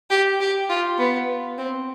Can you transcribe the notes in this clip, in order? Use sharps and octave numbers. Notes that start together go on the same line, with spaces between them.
G4
G4
F4
B3
C4